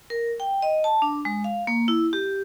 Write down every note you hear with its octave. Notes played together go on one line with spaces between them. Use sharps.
A#4
G5
D#5
A5
D4
G#3
F5
A#3
E4
G4